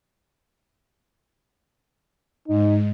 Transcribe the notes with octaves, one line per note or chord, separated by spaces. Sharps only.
G#2 D#4